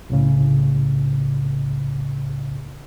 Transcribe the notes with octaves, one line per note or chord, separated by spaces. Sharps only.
C2 A2 C#3